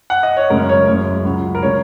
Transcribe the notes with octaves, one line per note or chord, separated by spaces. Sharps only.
F#5
D#5
C#5
F#2 C#3 G#3 C#4 A#4
C#5
F#1 F#2 C#3 G#3
C#2 C#3 F#3
A#4
C#3 G#3 C#5